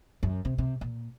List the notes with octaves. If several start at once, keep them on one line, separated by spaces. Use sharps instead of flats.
F#2
C3
C3
A#2